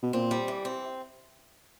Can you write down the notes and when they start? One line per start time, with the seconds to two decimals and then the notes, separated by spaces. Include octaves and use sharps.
0.02 B2
0.13 A#2 C4
0.31 G3
0.48 E3
0.65 C4